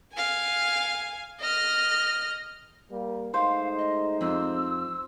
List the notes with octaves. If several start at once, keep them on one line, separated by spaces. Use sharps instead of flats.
F5 G#5
D#5 F6
G3 A#3
G#3 A3 D#4 C5 F5
D#5
F2 C4 E6